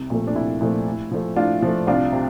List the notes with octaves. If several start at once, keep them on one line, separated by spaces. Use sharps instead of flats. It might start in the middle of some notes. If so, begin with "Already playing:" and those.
Already playing: C2
A#2 F3 A3
D4
C2 E4
A#2 F3 A3
A2
F3 A3
A2 D4 F4
F3 A3
C2 D4 F4
C3